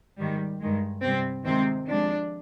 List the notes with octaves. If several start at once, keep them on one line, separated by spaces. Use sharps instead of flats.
G#2 D#3 G3
G2 D#3 G#3
C3 G3 C4
C3 D#3 G#3 C4
C3 F3 G#3 D4